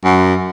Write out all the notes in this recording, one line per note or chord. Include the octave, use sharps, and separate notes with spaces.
F#2